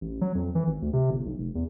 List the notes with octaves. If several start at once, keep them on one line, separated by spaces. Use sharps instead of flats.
A1
F#3
F2
E3
G#1
D2
C3
G1
B1
F1
E2